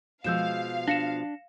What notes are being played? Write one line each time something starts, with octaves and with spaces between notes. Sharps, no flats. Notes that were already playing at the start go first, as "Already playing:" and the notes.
B2 F3 G#3 F5 E6 G6 E7
D4 A#6 C#7 E7